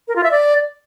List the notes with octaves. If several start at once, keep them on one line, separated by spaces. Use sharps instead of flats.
A#4
F4
E5
D5